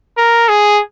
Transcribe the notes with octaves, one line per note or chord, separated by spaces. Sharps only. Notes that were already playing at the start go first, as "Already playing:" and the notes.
A#4
G#4